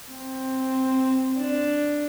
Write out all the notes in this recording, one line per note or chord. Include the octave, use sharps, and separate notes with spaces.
C4
D4